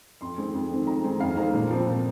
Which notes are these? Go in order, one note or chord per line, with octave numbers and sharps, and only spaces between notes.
F2 C6
D#3 G#3 C4
F2
D#3 G#3 C4
F2 A#5
D#3 G#3 C4
F2 F5
D#3 G#3 C4 A#5
A#2
F3 C4
A#2